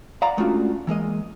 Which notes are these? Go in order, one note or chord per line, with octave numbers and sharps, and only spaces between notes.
D5 F5 F#5 A#5 C6
G#3 A3 C#4 D4 F4 F#4
E3 G#3 A#3 D#5